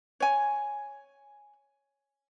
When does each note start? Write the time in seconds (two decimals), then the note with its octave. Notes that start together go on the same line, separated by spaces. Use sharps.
0.20 C#5 G#5